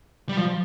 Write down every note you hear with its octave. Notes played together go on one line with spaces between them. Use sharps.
G3
F3